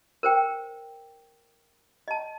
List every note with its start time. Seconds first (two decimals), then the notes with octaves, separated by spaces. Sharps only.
0.23 A#4 C5 G5
2.08 D#5 A5